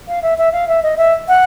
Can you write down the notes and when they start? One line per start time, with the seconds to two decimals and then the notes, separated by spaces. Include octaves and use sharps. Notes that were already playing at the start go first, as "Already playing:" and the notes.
0.08 F5
0.23 E5
0.38 E5
0.52 F5
0.68 E5
0.83 D#5
0.98 E5
1.28 F#5